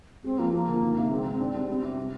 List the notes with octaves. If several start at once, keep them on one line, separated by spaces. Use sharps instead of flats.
G#3 C4
F3 A#3
F3 A#3
D3
D#3
C3
G#3 C4
D#3
D4
G3
G3 C4
C3 G4
G3 C4